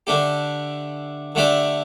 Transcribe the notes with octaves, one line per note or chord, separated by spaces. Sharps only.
D3 A3 D4 G4
D3 A3 D4 G4 D5